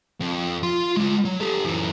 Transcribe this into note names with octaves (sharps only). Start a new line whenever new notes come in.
F2
F4 C6
G#3 F4
F#3
G4 A4
F#2 E3